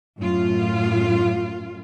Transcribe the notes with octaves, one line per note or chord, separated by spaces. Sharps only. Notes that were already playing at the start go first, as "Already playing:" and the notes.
F#2 A2 F4